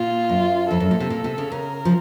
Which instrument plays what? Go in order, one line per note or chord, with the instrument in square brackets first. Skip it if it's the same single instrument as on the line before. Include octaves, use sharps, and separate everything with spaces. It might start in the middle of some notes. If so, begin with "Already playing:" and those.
Already playing: [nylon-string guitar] A#2 [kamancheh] F4
[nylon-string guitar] F#2
[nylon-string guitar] F2 [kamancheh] A4
[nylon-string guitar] F#2
A#2
C3
A#2
C3
C#3
[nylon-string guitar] C#3 [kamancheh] A#4
[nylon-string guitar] F3